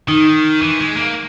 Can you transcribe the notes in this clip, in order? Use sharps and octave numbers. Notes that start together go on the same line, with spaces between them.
D#3 D#4
E3
G#3
A#3